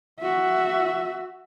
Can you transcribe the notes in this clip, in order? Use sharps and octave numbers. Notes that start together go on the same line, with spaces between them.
F#4 E5